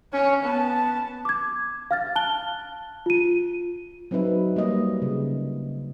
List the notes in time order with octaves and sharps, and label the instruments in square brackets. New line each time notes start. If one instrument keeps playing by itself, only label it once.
[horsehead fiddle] C#4 C#5
B3 A5
[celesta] D6 G#6
F5 F6 A6
A5 F#6 G7
F4 D#7
[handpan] F#3 C4 D#4 B4 E5
G3 A#3 D#5
C#3